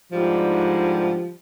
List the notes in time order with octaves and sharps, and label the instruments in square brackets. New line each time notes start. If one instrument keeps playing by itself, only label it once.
[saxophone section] G#2 D3 G3 [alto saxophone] F3